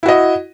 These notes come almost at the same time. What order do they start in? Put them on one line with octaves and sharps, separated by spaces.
E4 F#4 D#5